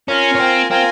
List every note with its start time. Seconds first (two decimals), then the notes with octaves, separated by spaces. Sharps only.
0.09 C#4 F4 A#4 F5 G#5
0.35 C#4
0.40 C4
0.70 C4 F4 A#4 F5 G#5